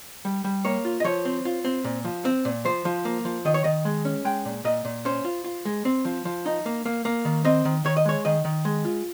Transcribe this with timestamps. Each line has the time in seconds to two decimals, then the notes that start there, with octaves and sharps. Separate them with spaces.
0.25 G3
0.44 G3
0.65 A#3 C#5
0.85 F4
1.00 D#5
1.04 F3 C#5
1.25 C4
1.45 F4
1.65 C4
1.84 A#2
2.05 F3
2.25 C4
2.45 A#2
2.65 F3 C5
2.85 F3
3.05 A#3
3.25 F3
3.45 D#3 D#5
3.54 C#5
3.64 D#3 D#5
3.85 G#3
4.05 C#4
4.25 G#3 G5
4.45 A#2
4.64 A#2 D#5
4.85 A#2
5.05 C#4 C5
5.25 F4
5.44 F4
5.65 G#3
5.85 C4
6.05 F3
6.25 F3
6.46 D#4
6.66 A#3
6.86 A#3
7.05 A#3
7.25 D#3
7.45 C4 D#5
7.65 D#3
7.85 D#3 C#5
7.97 D#5
8.05 G#3 C#5
8.25 D#3 D#5
8.45 D#3
8.65 G#3
8.85 F4